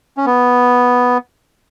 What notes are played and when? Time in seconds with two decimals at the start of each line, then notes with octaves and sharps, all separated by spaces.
0.17 C#4
0.26 B3